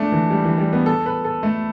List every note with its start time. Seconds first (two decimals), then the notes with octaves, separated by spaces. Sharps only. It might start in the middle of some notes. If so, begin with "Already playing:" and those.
Already playing: A3 D4
0.12 E3
0.31 G3
0.44 E3
0.58 G3
0.73 B3
0.86 A4
1.06 B4
1.25 A4
1.43 A3